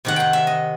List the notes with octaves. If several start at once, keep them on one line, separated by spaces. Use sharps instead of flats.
C3 D#3 F#5
F#5 G5
E5
D#5